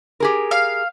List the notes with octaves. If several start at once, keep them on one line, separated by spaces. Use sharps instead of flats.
G4 G#4 A#4
F5